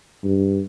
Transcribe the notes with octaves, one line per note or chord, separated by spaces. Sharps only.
G2